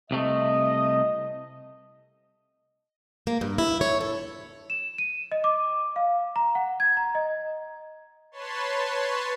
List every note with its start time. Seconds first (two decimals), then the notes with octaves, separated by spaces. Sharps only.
0.11 C2 C3 A3 D#5
3.27 A#3
3.41 G2
3.58 E4
3.81 C#5
4.01 A4
4.70 E7
4.98 D#7
5.32 D#5
5.44 D6
5.96 F5
6.36 A#5
6.55 F#5
6.80 G#6
6.97 A#5
7.15 D#5
8.32 B4 C#5 A5 C6